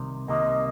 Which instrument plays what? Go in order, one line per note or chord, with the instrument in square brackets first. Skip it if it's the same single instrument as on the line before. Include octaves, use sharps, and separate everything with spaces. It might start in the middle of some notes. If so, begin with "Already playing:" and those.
Already playing: [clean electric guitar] C2 C3 D#3
[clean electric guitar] C2 C3 D#3 G3 A#3 [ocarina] D#5